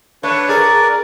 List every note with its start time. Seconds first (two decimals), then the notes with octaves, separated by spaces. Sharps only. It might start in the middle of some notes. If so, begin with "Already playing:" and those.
0.23 A3 D4 B4 C#5
0.49 G#4 A#4 D5